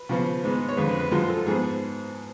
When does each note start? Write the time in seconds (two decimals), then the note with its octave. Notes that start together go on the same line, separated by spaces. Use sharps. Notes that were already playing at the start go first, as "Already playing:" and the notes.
Already playing: B4
0.09 C#3 F3 B3
0.43 G#2 G#3 B3
0.69 C#5
0.77 F2 D3 G#3 B4
0.89 B4
1.00 B4
1.11 F#2 F3 G#3 F4
1.29 A4
1.46 G#2 F3 B3 G#4